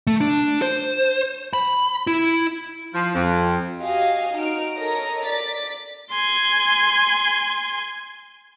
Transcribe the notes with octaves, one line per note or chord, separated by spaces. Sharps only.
A3
D4
C5
B5
E4
F3
F2
F#4 G4 D#5 F5 G#5
D#4 F#4 F6 D7
A4 A#4 C#5 D#5 A#5
D5 A6 B6
G#5 C6